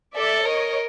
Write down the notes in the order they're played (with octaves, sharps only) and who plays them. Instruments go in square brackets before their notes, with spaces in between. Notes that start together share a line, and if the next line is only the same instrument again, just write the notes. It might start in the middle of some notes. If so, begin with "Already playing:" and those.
[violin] A4 [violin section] D5 E5
[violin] A#4 [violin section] C#5 D#5